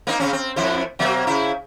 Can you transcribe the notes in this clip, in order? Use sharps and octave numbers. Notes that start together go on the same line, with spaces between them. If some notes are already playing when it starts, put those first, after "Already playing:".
A#3 C4 D#4
C#3 C4 C#4
C4
F2 E4 C5
B2 F#3 A#3
C#3 E4